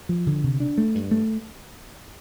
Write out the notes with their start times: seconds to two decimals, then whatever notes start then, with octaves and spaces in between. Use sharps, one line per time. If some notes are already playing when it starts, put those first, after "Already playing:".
0.09 F3
0.27 D3
0.44 C3
0.60 D4
0.78 A3
0.95 G2
1.11 A3